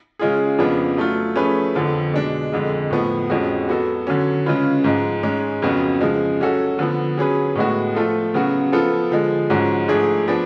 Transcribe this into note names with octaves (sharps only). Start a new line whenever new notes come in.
C#3 G#3 C#4 F4 G#4
F2 C#3 F3 B3 D4
F#3 A3 F4
F3 A3 C#4 G#4 B4
F2 D3 F3
B2 G#3 D4
F2 D3 G#3
A2 F3 B3
F2 F3 G#3 C#4 F#4
F#3 B3 F#4 A4
D3 F#3 C#4
C#3 G#3 C#4 F4 B4
G#2 F3 G#3
G#2 G#3 C#4
F2 C#3 F#3 B3 F#4
C#3 F3 G#3
F#3 C#4 F#4 A4
D3 F3 B3
F#3 C#4 G#4 B4
A2 G#3 B3 F#4
F3 A3 F4 A4
C#3 F#3 B3 F#4
F3 B3 F4 A4
D3 F3 G#3
G#2 F3 G#3 C#4 F#4
G#2 F3 A3 D4 G#4
F3 B3 D4